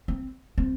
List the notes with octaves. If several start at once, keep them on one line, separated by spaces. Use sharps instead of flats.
C4
C4